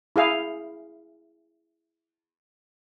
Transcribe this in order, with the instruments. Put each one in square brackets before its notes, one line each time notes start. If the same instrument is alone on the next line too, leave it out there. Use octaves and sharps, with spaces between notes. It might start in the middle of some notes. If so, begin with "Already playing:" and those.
[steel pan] E4 G#4 F5